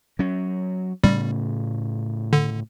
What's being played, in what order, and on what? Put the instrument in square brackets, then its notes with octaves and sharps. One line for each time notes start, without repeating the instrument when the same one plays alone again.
[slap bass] F#3 C#4
[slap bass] A2 C#3 [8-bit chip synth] G3
[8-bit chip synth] D3